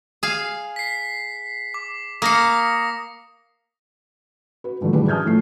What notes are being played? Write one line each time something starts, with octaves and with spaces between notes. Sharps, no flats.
G#4 F5
B6 C7
D6
A#3 F5 D#6 A#6 C#7
F#4 B4
G#2 D3 F3 G3 A3
B1 D3 E3 G3 G#4 B4
A5 D#6 F6 G6 G#6
A2 F3 A3 C7